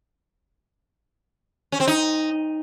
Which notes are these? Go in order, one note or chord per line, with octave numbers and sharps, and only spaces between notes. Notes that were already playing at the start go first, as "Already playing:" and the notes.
C#4
C4
D#4